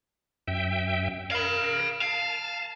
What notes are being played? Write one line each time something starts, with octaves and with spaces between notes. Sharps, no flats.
F#2 E5 G5
A#4 F5 B5
F5 A5